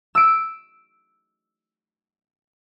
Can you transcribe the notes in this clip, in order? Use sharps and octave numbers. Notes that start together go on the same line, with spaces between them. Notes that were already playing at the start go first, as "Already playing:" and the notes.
E6 D7